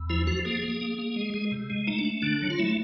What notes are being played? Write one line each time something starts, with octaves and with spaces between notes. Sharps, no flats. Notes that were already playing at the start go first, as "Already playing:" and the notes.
Already playing: E2
F3 E4
F3 F#4
A#3 G#4
A#3
A#3
A#3
G#3
G#3
C3
G#3
A3 D#4
D4
A3
D3 D4
F#3
F4
A3 E4